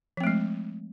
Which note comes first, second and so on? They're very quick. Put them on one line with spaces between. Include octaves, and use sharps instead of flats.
F3 C4 A3 G#3